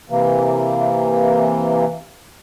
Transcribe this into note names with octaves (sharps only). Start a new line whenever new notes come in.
C3 E3 A#3